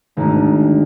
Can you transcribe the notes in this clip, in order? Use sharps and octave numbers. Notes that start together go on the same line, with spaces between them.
G#1 D2